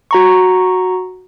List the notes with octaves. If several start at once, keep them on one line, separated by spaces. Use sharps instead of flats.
F#4 A#5 C#6